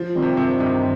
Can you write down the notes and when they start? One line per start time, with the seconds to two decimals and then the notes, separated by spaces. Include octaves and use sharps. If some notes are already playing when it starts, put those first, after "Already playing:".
Already playing: F3
0.14 D#3 G3 C4
0.22 C3
0.37 G2 C3
0.59 C3 D#3 G3 C4